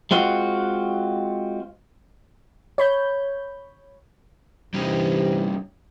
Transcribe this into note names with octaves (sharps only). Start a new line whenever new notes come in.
G#3 C4 F4 F#4
C#5 B5 G6
G2 C3 E3 G3 C#4 D#4